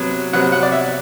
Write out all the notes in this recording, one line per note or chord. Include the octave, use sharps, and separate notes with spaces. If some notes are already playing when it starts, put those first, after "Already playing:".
Already playing: C3 F#3 B3
C3 F#3 B3 F#5
F#5
D5
E5